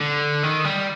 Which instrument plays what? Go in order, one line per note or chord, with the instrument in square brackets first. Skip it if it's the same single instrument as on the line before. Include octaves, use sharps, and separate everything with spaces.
[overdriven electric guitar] D3
D#3
G3